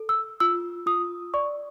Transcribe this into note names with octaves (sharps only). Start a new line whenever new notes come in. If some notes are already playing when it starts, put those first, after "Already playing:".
Already playing: A4
E6
F4 E6
F4 D#6
D5 C#6